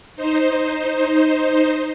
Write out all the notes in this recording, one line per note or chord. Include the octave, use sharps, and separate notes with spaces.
D#4 C5